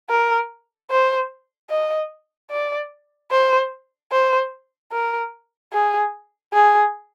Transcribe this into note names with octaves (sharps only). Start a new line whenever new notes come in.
A#4
C5
D#5
D5
C5
C5
A#4
G#4
G#4